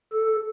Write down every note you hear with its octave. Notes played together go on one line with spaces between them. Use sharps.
A4